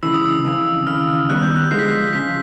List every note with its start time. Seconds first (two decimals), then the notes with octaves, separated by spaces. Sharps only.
0.03 C#2 C#3 E3 E6
0.14 D#6
0.26 E6
0.45 F2 C#3 E3
0.87 D#2 C#3 E3 F6
1.29 D#2 D#3 G3 B3 F#6
1.42 G6
1.56 F#6
1.71 D3 F3 G#3 C7
1.79 B6
1.85 C7
2.13 C#3 F3 B6